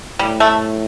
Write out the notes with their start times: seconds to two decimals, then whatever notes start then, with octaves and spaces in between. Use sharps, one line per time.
0.19 A2 G3
0.40 A3